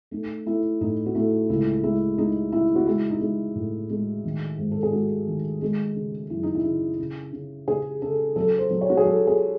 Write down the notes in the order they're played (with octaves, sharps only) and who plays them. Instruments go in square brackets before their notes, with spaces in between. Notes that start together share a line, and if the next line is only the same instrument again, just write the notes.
[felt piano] A3 D#4
A3 E4
A2 D#4
F#4
A3 E4
C#2 E4
G#3 E4
G#3 D#4
C#3 E4
F#4
G#3 E4
D#4
G#3
A2
G#3
D#3
G#2
A4
G#4
G#3 F#4
D#3
G#3
C#3
F#2 E4
D#4
E4
C#3
C#3
C#3
C#3 G#4
C#3 A4
F#3 A4
C5
F#3
C#5
F#4
G#4
F#3 A4
G#4